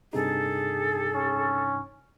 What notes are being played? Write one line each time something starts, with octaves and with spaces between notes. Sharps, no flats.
G2 C3 D#4 G#4 A4
C#4